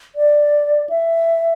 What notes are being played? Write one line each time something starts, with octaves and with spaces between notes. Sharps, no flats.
D5
E5